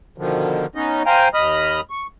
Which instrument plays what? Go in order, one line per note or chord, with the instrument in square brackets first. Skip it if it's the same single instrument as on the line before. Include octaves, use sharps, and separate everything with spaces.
[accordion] B2 D3 D#3 F3
B3 C#4 D#4 D#5
C5 F5 G5 G#5 A#5
D#2 D#5 B5 D#6 F6
C#6